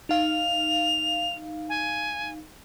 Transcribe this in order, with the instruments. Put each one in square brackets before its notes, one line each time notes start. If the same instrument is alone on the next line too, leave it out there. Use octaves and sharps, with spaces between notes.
[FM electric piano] D#4 F5 [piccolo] F7
[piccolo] G#5